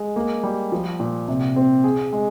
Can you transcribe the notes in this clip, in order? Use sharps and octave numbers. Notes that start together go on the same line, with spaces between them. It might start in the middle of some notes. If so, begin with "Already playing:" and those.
Already playing: G#3
A#3
G3
F3
A#2
C3
C4
G#4
G#3